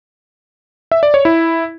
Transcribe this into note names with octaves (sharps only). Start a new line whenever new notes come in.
E5
D5
C#5
E4